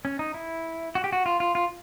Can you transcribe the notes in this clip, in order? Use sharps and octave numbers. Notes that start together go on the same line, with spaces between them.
C#4
D#4
E4
F#4
G4
F#4
F4
F4
F4